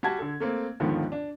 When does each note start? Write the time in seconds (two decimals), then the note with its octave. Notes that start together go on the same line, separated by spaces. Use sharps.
0.03 G3 F#4 A5 G#6
0.18 D3 A4
0.40 A3 A#3 C4
0.80 D#2 G#2 D3 D#3 F3 B3
1.12 D4